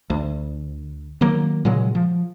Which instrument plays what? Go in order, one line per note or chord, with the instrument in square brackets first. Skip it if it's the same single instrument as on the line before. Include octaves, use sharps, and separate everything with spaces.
[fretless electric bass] D2
D#3 F#3 A#3
A#2 C#3 F#3 G#3
F3